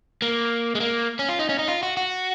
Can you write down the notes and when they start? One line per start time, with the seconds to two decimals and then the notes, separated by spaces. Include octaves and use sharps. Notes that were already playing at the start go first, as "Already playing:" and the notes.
0.22 A#3
0.75 G#3
0.80 A#3
1.19 C#4
1.29 F4
1.39 D#4
1.49 C#4
1.59 D#4
1.68 F4
1.83 F#4
1.97 F#4